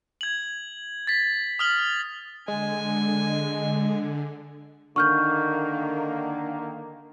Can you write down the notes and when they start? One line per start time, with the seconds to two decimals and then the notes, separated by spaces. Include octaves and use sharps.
0.21 G#6 F#7
1.07 A6 B6
1.59 D#6 F6 F#7
2.48 D3 G#3 G#5
4.96 D3 D#3 A#3 C#6 F6 G6